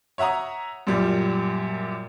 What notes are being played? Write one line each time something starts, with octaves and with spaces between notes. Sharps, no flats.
C#5 E5 F#5 A#5 D#6
F#2 A#2 G3